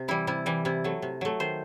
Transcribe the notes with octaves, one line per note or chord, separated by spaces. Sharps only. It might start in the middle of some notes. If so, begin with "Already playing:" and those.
Already playing: C3
E3 G3 E4
C3 E4
E3 G3
C3 E4
F#3 A3
C3
F#3 A3
D#3 C5